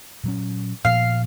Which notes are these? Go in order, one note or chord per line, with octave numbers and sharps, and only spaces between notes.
A#2 F#3 C#4
A#2 F3 B3 F5